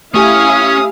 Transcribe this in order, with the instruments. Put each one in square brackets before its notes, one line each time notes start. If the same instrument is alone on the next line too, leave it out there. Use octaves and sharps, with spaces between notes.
[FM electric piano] A3 G4 G#5 [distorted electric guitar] C#4 C#5 [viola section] E4 F5 [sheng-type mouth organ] D#6